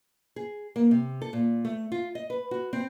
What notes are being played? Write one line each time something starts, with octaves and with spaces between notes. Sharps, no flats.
G#4
A#3
C3
A4
A#2
A3
F4
D#5
B4
F#4
C4